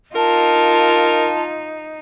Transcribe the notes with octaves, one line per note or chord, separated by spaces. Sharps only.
D#4 F4 A#4 A5